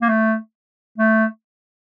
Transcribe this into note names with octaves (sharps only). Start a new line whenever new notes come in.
A#3
A3
A3